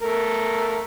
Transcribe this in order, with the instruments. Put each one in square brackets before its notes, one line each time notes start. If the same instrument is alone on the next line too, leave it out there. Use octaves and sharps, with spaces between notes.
[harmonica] A3 A#4